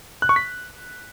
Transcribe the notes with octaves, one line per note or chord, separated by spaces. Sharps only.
F#6
C#6
B6